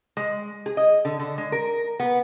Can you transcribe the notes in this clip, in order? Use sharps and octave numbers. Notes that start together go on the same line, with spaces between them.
G#3
G#4
D#5
D3
D3
G#3
A#4
B3